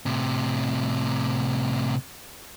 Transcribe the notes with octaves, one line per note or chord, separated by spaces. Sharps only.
A2 C3